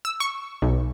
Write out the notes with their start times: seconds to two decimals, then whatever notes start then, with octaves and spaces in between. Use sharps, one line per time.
0.05 E6
0.20 C#6
0.62 B1